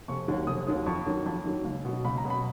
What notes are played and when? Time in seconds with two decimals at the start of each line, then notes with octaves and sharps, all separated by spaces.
0.08 F1 C#6
0.28 D#2 D#3 F#3
0.47 F1 D#6
0.67 D#2 D#3 F#3 D#6
0.86 F2 C#6
1.06 D#3 F#3
1.26 F2
1.46 D#3 F#3
1.65 C#2
1.85 B2 F#3
2.05 C#2 B5
2.18 A#5
2.25 B2 F#3
2.30 B5